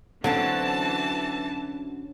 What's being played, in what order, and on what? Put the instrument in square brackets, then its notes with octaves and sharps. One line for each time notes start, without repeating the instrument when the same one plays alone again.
[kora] D3 [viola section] E3 A5 [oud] F#3 C4 C#4